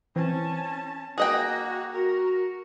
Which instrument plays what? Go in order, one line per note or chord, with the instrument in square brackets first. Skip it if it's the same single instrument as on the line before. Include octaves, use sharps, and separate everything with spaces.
[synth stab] E3 C4 [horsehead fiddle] C#4 A5
[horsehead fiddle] A#3 F#4 [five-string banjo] G#4 D#5 G5 [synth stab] F#5
[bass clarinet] F#4 [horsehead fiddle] A#4